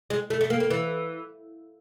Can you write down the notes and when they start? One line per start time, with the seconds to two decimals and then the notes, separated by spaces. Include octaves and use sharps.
0.10 G#3
0.30 A3
0.41 A3
0.50 A#3
0.60 A#3
0.70 E3